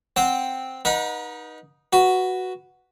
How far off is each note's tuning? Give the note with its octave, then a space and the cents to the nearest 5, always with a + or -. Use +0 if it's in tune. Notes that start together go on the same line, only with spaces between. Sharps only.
C4 +0 C5 +0 F#5 +0
D#4 +0 B4 -40 F#5 -30
F#4 +0 B4 +0